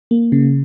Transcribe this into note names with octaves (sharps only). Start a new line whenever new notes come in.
A#3
C#3